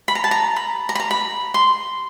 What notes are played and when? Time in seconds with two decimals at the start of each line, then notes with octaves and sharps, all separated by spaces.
0.08 B5
0.15 A#5
0.24 A5
0.31 A#5
0.56 B5
0.89 A#5
0.95 B5
1.00 A#5
1.11 B5
1.54 C6